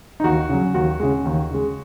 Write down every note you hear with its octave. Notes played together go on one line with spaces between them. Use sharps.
D#4
D#2 F#4
C#3 F#3
D#2 F#4
C#3 G#3
D#2
C#3 G#3